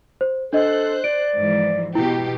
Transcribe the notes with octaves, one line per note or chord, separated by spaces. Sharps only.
C5
D4 A4 C5 D#5 F#6
D5 D7
G#2 E3 F3
B2 E4 G4